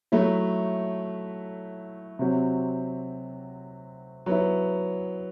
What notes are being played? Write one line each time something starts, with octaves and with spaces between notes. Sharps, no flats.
F#3 A3 E4
C3 F#3 C4 F#4
F#3 B3 E4